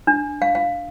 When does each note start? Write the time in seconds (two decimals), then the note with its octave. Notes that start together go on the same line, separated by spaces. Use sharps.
0.07 D4
0.42 F5
0.55 F5